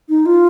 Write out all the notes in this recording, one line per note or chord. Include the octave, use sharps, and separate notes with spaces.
D#4
F4